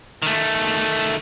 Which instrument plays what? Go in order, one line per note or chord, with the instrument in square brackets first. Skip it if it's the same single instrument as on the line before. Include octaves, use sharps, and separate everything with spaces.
[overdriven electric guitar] D#3 A3